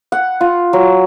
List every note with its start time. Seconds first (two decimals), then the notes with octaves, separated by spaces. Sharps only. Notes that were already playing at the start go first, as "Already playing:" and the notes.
0.12 F#5
0.41 F4
0.73 F#3